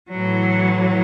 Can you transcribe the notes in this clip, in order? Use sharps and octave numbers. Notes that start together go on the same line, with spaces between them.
A2 E3 F#3